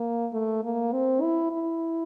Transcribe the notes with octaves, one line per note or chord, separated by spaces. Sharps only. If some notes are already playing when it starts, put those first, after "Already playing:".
Already playing: A#3
A3
A#3
C4
E4
E4